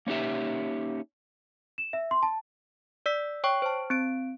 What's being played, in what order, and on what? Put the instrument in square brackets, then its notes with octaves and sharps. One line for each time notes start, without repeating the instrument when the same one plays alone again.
[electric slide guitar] A#3 C#4 D#4 G4 E5
[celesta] E7
E5
C6
A5
[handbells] D5 E6 B6
C#5 G5 C#6
C5 A5
C4 D7